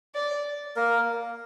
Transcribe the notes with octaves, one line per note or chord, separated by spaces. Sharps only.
D5
A#3 A#4